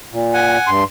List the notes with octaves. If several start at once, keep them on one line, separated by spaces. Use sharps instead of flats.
A#2
F#5 G#5
G2 C6